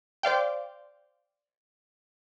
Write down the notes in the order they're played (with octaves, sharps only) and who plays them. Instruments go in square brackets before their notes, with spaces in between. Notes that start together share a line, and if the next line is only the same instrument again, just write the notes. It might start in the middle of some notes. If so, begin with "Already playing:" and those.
[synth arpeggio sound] C5 D5 F5 G5